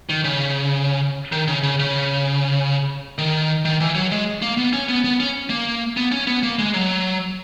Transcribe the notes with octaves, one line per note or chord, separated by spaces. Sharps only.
D#3
C#3
D#3
C#3
C#3
C#3
D#3
D#3
E3
F#3
G#3
A#3
B3
C#4
B3
B3
C#4
A#3
B3
C#4
B3
A#3
G#3
F#3